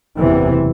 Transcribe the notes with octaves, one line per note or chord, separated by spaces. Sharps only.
F#1 E2 C3 E3